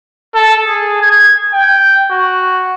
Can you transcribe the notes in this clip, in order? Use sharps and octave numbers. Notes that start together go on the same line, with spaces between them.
A4
G#4
G#6
G5
F#4